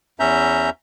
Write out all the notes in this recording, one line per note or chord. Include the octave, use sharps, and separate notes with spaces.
E2 C#4 E5 A#5 G6